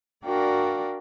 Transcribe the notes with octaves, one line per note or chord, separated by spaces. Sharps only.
D4 F#4 A#4 D5 F5 G5